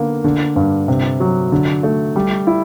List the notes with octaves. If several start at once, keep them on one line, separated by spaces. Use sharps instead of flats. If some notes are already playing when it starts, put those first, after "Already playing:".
Already playing: D3 A#3 B3
D3
G2
C3
F#3
D3
A3
G3
E4